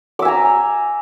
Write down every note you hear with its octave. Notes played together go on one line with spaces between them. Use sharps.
E5 G#5 A#5 D6